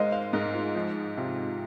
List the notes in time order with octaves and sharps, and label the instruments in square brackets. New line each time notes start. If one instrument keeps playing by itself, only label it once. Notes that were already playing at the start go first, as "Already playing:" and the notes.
Already playing: [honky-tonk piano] G#2 G#3 [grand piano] A#4 C5 D#5 F5
[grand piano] C5 F5
[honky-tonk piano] G#2 [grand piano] A#4 D#5
[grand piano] F4
[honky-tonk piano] F3 [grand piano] D#4
[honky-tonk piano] C3 [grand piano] F4